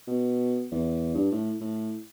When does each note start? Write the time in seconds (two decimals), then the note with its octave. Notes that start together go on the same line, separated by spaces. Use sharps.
0.07 B2
0.72 E2
1.14 G2
1.32 A2
1.61 A2